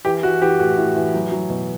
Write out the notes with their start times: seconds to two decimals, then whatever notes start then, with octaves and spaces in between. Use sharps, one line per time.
0.05 E3 G4
0.23 E3 F#4
0.42 E3 G4
0.59 A2 F#4
0.78 A2
0.96 E3
1.14 F#3
1.32 F#3
1.50 B2